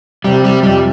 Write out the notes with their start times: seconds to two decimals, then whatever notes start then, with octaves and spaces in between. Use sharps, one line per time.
0.24 C3 G3
0.44 G3
0.63 F2 G3